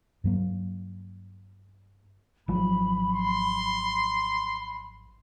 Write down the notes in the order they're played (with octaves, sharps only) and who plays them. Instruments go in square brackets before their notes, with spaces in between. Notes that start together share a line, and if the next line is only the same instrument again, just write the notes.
[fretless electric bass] G2 F#3 A#3
[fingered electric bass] G#1 F3 F#3 [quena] B5
[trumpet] C6